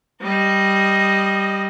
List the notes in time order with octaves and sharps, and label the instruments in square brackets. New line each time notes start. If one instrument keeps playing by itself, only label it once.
[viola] G3 D#5